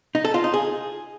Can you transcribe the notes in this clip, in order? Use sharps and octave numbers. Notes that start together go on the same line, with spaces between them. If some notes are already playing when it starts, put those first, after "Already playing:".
D#4
A4
F4
D#4
G#4